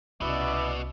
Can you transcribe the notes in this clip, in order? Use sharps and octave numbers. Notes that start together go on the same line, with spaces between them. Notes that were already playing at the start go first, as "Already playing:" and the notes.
C2 B2 C#4 E4 F#4 D5 D#5